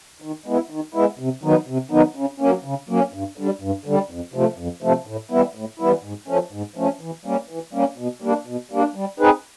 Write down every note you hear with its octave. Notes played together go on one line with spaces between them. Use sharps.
D#3
G#3 B3 E4
D#3
G#3 B3 E4
C3
D#3 F#3 B3 D#4
C3
D#3 F#3 B3 D#4
C#3
F#3 A#3 C#4
C#3
F#3 A#3 C#4
G2
D3 G3
G2
D3 G3
F2
C3 F3 A3
F2
C3 F3 A3
A2
E3 G3 B3 E4
A2
E3 G3 B3 E4
G#2
F3 A3 C#4
G#2
F3 A3 C#4
E3
G3 A#3 C#4
E3
G3 A#3 C#4
B2
G3 A#3 D4
B2
G3 A#3 D4
G3
C4 D#4 G#4 B4